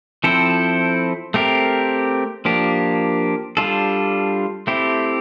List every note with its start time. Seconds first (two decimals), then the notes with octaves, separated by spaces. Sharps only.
0.24 F3 C4 E4 A4 C5
1.34 A3 C4 G4 A#4
2.45 F3 A#3 D4 G4
3.57 G3 D4 F4 A4
4.67 A3 C4 E4 G4